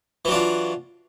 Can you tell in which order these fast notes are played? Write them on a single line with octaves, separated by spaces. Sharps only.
E3 F#3 D4 F4